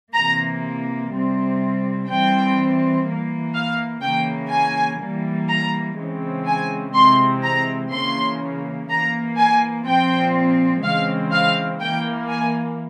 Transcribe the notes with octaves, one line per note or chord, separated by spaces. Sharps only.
C3 E3 A#3 A#5
C3 G3 C4
E3 G3 C4 G5
E3 A#3
F5
C#3 E3 A#3 G5
G#5
E3 G3 A#3
A#5
C#3 E3 G#3 C4
G#5
C3 E3 G#3 C4 C6
A#5
C#3 E3 A#3 C6
E3 A#3 A#5
G#5
A#2 F3 C4 G5
C#3 E3 G#3 C4 F5
F5
E3 A#3 G5
G#5